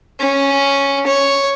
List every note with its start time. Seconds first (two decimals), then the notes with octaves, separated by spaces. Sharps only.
0.20 C#4
1.07 C#5